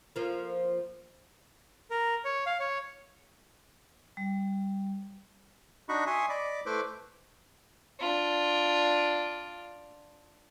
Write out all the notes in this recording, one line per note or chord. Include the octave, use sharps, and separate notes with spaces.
F3 A#3
A#4
C#5
F5
C#5
G3
D4 D#4 F#4 D#5 B5 C#6
E5 G#5 C6 C#6 D#6
D5 D#5 B5 D6
A3 E4 B4 C5 D6
D4 F4